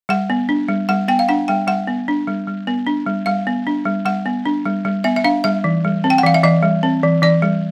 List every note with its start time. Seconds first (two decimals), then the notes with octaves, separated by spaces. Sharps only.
0.09 G3 F#5
0.30 B3
0.49 D4
0.68 G3
0.89 G3 F#5
1.08 B3 G5
1.19 F5
1.29 D4 F#5
1.48 G3 G5
1.67 G3 F#5
1.87 B3
2.08 D4
2.28 G3
2.47 G3
2.67 B3
2.87 D4
3.07 G3
3.26 G3 F5
3.47 B3
3.67 D4
3.85 G3
4.05 G3 F#5
4.26 B3
4.45 D4
4.65 G3
4.85 G3
5.04 B3 E5
5.16 E5
5.24 D4 F5
5.44 G3 E5
5.64 E3
5.84 G3
6.04 C4
6.10 G5
6.18 F#5
6.23 E3 F5
6.34 E5
6.44 E3 D#5
6.63 G3
6.83 C4
7.03 E3
7.22 E3 D5
7.42 G3